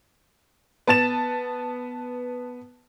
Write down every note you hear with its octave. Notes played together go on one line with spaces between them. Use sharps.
B3 A5 A6 E7